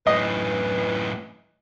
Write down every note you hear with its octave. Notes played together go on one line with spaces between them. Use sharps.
F#2 A2 E3 B4 D#5